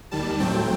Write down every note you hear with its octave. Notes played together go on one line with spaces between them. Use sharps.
D#2 D#3 G3 A5
A2 F#3 A3 C4 G5